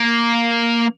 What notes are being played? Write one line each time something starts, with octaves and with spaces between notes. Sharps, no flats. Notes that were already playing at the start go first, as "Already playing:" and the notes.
Already playing: A#3